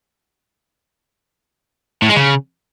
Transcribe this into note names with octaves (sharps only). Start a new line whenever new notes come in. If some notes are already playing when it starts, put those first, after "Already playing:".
A2
G#3
C#3